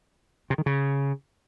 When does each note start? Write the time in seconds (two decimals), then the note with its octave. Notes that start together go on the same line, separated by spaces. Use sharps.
0.50 C3
0.58 D#3
0.66 C#3